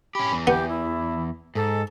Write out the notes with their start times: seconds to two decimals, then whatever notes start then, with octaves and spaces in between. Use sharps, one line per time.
0.15 C#4 G4 B5
0.32 E2 E3
0.47 B3 G4
0.69 E4
1.55 G#2 A4